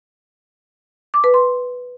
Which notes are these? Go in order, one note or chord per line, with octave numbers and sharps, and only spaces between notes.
D6
B4
C6